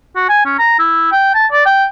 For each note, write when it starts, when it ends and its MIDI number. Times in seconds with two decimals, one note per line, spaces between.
0.16 0.24 66
0.29 0.44 80
0.45 0.56 61
0.59 0.78 82
0.79 1.10 64
1.12 1.32 79
1.34 1.46 81
1.52 1.64 74
1.65 1.86 79